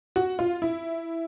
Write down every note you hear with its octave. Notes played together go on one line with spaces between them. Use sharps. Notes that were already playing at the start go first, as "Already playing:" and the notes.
F#4
F4
E4